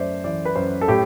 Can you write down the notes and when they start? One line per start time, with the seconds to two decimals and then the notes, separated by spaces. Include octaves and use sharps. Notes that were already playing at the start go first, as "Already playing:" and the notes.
Already playing: F#2 A3 C5 D5 E5
0.24 E3 D5
0.45 B4
0.56 F#2 C5
0.81 A4
0.88 A2 G4